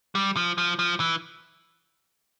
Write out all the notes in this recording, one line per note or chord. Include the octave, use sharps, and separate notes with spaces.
G3
F3
F3
F3
E3